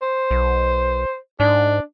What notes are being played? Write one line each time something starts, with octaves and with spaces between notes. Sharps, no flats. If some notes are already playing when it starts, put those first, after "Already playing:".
C5
B1
G#2 D4